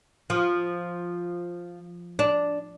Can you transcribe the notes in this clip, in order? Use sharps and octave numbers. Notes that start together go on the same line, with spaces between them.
F3
D4